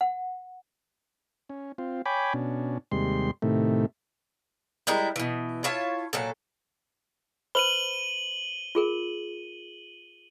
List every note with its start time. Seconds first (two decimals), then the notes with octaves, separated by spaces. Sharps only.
0.01 F#5
1.49 C#4
1.78 C4 F4
2.06 C#5 G5 G#5 B5 D6
2.33 B2 C#4 D4
2.92 D#2 C3 G3 G#3 C6
3.42 A2 C3 D#3 A3
4.87 G3 G#3 E4 A#4
5.16 B2 E3
5.64 E4 F4 C#5 A5
6.13 A#2 F#3 A4
7.55 B4 C5 B5 D#7 F#7 G7
8.75 F4 G#4 A#4